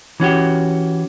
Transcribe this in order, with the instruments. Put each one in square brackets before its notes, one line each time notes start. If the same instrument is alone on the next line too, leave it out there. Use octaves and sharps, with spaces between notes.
[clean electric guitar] E3 C#4 F#4 G4